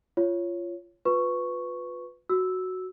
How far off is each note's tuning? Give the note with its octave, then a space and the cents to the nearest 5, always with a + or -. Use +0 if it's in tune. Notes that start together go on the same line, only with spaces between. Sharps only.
F4 -20 C#5 +0
F4 +30 B4 +10 C#6 +0
F#4 +0 E6 -5